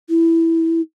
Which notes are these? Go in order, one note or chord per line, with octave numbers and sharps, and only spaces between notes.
E4